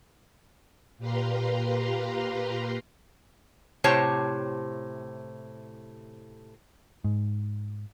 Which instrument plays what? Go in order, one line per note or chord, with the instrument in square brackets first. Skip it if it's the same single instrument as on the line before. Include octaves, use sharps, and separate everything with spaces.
[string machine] A#2 G4 B4 F5 A#5 C6
[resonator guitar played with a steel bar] A2 C3 G4 C5 C#5 A5
[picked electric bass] G#2